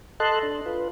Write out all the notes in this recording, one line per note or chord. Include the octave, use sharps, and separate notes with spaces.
A4 D#5 A5 C6 F#6
D4
F4 B4